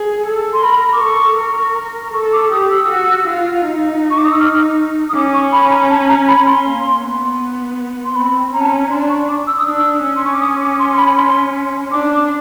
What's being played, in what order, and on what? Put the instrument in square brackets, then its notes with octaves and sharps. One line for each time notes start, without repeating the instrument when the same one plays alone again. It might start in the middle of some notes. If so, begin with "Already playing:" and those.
Already playing: [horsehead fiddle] G#4
A4
[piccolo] C6
[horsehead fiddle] A#4 [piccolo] B5
[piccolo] D6
[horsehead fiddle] A4 [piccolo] C#6
[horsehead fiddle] A#4
[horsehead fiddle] A4 [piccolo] C#6
[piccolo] D6
[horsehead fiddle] G4 [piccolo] D#6
[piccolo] E6
[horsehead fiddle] F#4
F4
D#4
[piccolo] C#6
D6
D#6
E6
F6
D#6
[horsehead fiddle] C#4 [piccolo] D6
[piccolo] C#6
B5
A#5
A5
A#5
B5
C6
[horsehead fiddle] A#3
B3
[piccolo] C6
[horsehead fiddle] C4 [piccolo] B5
[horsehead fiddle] C#4 [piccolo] A#5
[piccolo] A5
A#5
[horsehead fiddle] D4 [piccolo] C6
[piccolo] C#6
D6
E6
D#6
[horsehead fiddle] D4 [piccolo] E6
[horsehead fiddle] C#4
[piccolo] C6
C#6
D6
D#6
D6
C6
C6
B5
C6
[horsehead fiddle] D4 [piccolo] D6